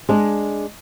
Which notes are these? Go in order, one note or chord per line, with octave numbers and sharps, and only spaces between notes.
G#3 D4